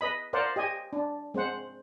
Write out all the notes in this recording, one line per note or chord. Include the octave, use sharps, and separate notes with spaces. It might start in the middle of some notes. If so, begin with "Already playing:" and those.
B4 D#5 B5
A#4 C5 D5 F5 F#5
G4 D#5 G#5
D4
G#3 C4 C5 F#5